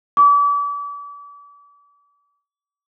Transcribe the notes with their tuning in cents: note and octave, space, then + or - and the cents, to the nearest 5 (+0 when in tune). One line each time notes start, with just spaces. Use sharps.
D6 -35